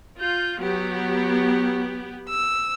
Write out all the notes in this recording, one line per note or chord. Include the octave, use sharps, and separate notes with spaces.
F4 G6
F#3 B3 G4
E6